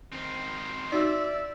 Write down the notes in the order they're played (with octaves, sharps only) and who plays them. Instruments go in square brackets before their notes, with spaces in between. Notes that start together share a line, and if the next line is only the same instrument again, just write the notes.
[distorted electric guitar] D#3 C4
[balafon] D#4 F#4 [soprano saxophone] D5 [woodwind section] E5 E6